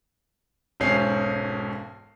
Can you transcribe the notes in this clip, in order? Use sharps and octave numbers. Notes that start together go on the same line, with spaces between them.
E1 B1 G#2 C#4 C7